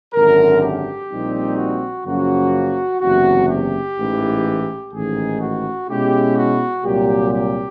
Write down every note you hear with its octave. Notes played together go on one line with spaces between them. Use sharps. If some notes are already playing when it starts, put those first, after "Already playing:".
G#1 F#2 D3 A#4
G4
A#1 A#2 G3 C4 D#4
F#4
F#2 C#3 F3 A#3 F#4
F#1 E2 C3 F#4
G4
A1 G#2 E3
A1 G#2 D#3 G#4
F#4
B2 G#3 C#4 E4 G4
F#4
C2 A#2 F#3 G4
G4